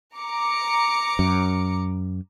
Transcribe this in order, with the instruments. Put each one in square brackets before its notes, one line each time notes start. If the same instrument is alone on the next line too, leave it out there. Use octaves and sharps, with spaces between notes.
[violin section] A#5 D6 C#7
[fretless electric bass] F#2